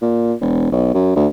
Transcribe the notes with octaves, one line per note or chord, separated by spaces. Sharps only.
A#2
E1
B1
F#2
D2